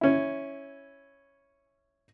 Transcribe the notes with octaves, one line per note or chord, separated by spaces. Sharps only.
C#4 E4